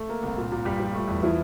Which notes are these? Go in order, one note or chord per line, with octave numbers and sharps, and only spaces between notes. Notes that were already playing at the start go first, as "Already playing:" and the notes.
Already playing: A3 A4
A#3
C2
A#2
A#2
G2 G3 G4
F3
A3
E2
E3 F3 E4